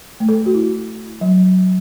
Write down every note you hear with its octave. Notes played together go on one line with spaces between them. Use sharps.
A3
A4
F#4
E4
F#3